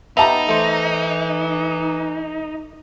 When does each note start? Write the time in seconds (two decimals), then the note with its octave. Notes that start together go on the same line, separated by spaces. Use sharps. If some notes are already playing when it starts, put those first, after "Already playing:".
0.17 B3 D#4 G4 E5 A5 A#5
0.49 E3 A3 C5